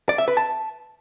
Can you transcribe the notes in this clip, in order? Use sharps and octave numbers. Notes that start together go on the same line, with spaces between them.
D5
E5
B4
A5